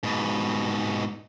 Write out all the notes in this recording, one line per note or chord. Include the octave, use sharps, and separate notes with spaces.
G#2 B2